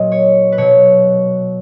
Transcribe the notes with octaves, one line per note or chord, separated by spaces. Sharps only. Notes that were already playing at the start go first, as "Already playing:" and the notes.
Already playing: A#2 F#3 D#5
C#5
B4
B2 F#3 C#5